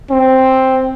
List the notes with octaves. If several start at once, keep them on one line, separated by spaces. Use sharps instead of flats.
C4